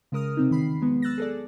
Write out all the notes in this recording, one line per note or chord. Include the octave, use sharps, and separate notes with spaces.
C#3 G#3 A#4 D#6 F6
C3 C4 D#4
E2 D#3 B5 C7
F#3 G#3 B3
E6 F#6 A6 A#6
G#4 A4 D5